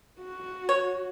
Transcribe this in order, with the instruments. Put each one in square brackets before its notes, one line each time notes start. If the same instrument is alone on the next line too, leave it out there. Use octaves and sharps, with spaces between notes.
[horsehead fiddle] F#4
[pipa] C#5